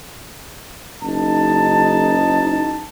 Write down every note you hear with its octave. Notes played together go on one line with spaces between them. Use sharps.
F#1 D#4 A5